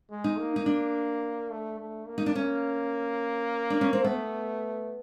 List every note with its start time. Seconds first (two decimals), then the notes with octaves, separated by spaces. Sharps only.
0.10 G#3
0.24 D#4
0.38 A#3
0.56 D#4
0.66 D4
1.51 A3
1.79 A3
2.07 A#3
2.18 D#4
2.26 D4
2.35 A#3 C#4
3.70 D4
3.81 C#4
3.93 C4
4.04 A3 B3